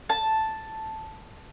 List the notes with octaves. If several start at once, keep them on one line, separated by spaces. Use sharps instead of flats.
A5